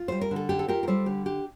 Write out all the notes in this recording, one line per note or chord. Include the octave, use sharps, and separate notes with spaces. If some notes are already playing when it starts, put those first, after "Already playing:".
Already playing: F4
G3 C5
A#4
D3
A4
D4 G4
A4
F4 G4 A#4
A#4
G3 A4 C5
D3 G4
D4 G4